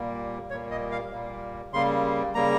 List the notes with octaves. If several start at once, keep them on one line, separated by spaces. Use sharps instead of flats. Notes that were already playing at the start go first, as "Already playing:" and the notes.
Already playing: A#2 G3 A#3
A#2 G3 A#3 C#5
D#5
F5
A#2 G3 A#3
C#3 G3 A#3 C6
C#3 G3 A#3 A#5